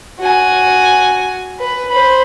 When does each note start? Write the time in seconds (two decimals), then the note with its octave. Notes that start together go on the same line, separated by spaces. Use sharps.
0.20 F#4 G#5
1.59 B4
1.90 C5 B5